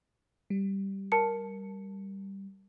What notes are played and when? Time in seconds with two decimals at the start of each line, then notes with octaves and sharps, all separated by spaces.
0.50 G3
1.12 A#4 A5 C#7